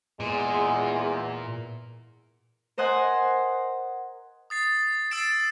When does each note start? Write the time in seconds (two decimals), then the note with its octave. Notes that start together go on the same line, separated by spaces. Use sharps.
0.20 E2 A#2 G#3
2.78 A#4 C5 D#5 F#5 G#5
4.50 D#6 A6 C7
5.11 E6 A6 C7 D7 E7